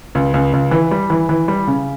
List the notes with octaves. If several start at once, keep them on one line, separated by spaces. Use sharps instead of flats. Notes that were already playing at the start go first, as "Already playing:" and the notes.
C#2
C#2
C#2
E3
G3
E3
E3
G3
C#3